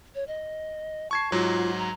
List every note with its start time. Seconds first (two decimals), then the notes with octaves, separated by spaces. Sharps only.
0.15 C#5
0.28 D#5
1.11 A5 C#6 G#6 C7
1.32 G#2 F#3 F4
1.77 A#5